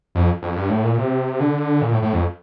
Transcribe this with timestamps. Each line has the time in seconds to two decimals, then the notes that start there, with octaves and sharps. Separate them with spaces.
0.15 F2
0.42 F2
0.56 G2
0.70 A2
0.84 A#2
0.98 C3
1.40 D3
1.82 A#2
1.92 A2
2.02 A2
2.13 F2